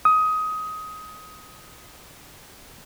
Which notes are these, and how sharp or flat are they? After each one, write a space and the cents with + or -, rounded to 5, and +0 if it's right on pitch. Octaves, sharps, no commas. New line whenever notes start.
D#6 +15